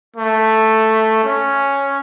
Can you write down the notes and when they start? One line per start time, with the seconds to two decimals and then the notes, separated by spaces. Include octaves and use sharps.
0.17 A3
1.24 C#4